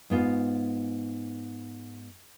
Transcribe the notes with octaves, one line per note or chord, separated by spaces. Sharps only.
G#2 B3 F4